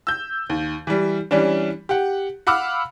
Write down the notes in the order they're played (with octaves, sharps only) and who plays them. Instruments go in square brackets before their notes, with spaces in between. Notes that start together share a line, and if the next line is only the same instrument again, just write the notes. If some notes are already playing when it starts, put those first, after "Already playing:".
[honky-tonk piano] E6 G6
D#2
E3 G3
E3 G3 C#4 D4
G4 F#5
F5 F#5 B5 D6 E6 F6